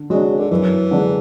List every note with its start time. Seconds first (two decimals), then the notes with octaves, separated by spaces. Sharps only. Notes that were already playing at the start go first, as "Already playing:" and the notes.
Already playing: D3
0.10 F#3 G#3 D4
0.39 D3
0.51 F#2 E3
0.91 D3 G#3 D4 G#4